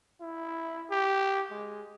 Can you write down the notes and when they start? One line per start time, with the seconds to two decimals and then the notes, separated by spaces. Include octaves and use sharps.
0.21 E4
0.91 G4
1.50 G#3